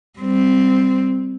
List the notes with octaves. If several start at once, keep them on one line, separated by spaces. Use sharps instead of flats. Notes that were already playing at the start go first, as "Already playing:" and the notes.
G3 C4